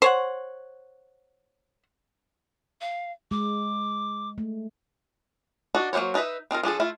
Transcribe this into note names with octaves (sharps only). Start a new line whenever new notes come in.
C5 C#5 F#5
F5
G#3 D6
A3
D4 D#4 F#4
F#3 A#3 G#4 C5 C#5
D4 D#4 A#4 B4 E5
C4 D#4 F4 A#4
F3 D4 G#4 A4
A3 E4 F4